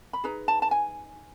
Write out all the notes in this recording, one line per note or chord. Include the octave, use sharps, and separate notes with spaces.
B5
D#4 G#4 B4 A#5
A5
A5
G#5